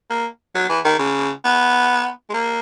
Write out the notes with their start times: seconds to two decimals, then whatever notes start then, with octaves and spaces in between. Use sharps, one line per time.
0.10 A#3
0.55 F#3
0.69 E3
0.85 D#3
0.99 C#3
1.45 B3
2.30 G#3
2.34 A#3